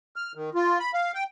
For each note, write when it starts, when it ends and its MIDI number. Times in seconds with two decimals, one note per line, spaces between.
0.16 0.32 89
0.35 0.50 51
0.55 0.78 65
0.80 0.91 83
0.94 1.12 77
1.14 1.24 79